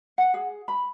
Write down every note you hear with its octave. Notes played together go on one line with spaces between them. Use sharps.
F#5
G#4
B5